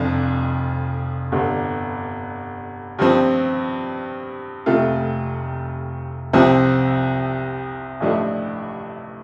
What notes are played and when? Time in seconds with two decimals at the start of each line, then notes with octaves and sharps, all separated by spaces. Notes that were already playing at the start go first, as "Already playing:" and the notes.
Already playing: F1 F2 F3 D4 F4
1.32 G1 G2 D3
2.99 G2 F3 C4
4.66 F1 F2 C3 A3 F4
6.33 C2 C3 F3 C4
8.00 A1 G2 F3 A3 D4